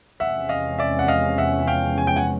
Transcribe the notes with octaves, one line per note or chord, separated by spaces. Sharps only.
E2 C3 F3 G#3 C#4 E5 F#5
D#5 F5
D5 E5
F#5
D#5 F5
E5 F#5
F5 G5
G#5
G5
F#5 G#5